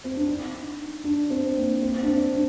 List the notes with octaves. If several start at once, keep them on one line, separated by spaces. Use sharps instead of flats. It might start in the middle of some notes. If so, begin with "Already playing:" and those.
C4
D4
D#4
D4
C4
A#3
C4
D4
C4
D4